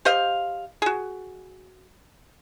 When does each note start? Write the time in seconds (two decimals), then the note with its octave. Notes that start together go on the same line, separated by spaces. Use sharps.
0.05 G4 C5 D#5 F5
0.82 F#4 G#4